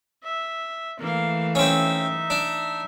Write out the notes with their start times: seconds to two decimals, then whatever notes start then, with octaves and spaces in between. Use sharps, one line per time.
0.23 E5
0.99 E3 A3 A#3 F5
1.55 C4 C#4 D#4 E5
2.30 D4